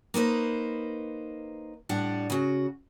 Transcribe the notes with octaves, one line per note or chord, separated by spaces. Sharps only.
A#3 D#4 B4 C5
A2 G3 D4 F#5
C#3 F#4